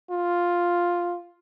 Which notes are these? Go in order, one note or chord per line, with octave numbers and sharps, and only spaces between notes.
F4